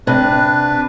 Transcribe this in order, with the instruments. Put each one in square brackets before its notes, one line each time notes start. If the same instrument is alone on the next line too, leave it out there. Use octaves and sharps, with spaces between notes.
[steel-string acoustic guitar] C3 [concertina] D4 B4